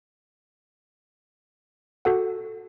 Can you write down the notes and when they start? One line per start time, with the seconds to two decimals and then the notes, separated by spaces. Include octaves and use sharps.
2.05 F#4 A4 F#5